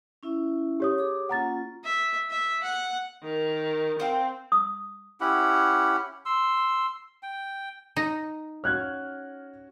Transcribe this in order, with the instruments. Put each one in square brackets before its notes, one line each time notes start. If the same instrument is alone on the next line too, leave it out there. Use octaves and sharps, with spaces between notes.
[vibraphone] C#4 E4 E5
[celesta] G4 C#5 D#6
[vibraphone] G#4 D6
[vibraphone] A#3 C#4 F4 [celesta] F#5 A#5 A6
[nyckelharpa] E5
E5
F#5
[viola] D#3 [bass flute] A#4
[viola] C4 [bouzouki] C5 F5 G5
[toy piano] D#6
[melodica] C#4 E4 G4 F#5
C6 E6
G5
[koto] D#4
[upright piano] C#4 F#4 [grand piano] F6 F#6 G#6